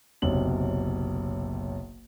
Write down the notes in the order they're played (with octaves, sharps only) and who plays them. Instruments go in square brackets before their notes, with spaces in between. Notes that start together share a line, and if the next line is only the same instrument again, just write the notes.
[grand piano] F#1 B1 C3 F#7